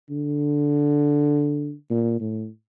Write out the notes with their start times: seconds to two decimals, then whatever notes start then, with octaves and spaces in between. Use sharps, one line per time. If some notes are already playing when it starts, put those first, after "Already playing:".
0.10 D3
1.90 A#2
2.20 A2